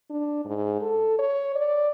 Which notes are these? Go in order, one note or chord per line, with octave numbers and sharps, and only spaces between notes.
D4
G#2
A4
C#5
D5